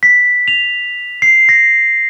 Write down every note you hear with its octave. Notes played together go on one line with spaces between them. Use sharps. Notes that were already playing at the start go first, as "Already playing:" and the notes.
B6
F7
C7
A#6